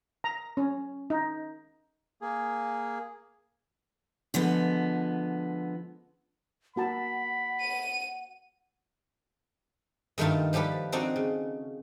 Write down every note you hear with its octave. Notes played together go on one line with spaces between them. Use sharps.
A#5
C#4
D#4
A#3 G#4
D3 F3 G#3 B3
A#3 F#4 F#5 A5 B5
D#7
G2 D#3 A3 A#3 F4 A5
F3 G3 G4 A4 B4
C4 D4 D#4 F#4 A4
C#3